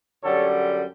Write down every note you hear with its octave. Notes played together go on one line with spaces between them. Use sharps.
F#2 D3 G3 A4 C#5